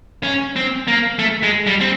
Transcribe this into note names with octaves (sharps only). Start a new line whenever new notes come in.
C#4
C4
A#3
A3
G#3
G3
C4